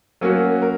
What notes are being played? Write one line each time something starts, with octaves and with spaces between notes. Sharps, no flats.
F#3 A#3 C#4 F#4
A#4